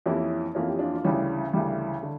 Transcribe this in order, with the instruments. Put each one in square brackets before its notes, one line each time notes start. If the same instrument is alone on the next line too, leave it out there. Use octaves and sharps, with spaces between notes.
[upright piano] F2 E3 A#3 C#4 [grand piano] E4 G4
[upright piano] F2 E3 A#3 C#4 [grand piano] F4
[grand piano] G4
D4 F4
F4
[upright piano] D2 C#3 E3 G3 [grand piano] C#4 E4
[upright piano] D2 C#3 E3 G3
D3